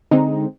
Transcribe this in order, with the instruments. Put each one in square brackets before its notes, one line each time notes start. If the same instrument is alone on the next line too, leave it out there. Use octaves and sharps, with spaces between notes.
[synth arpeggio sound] D3 G#3 C4 D#4